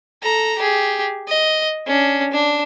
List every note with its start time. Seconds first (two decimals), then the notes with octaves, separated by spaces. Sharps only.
0.22 A4 A#5
0.58 G4 G#4
1.28 D#5
1.87 C#4 D4
2.32 D4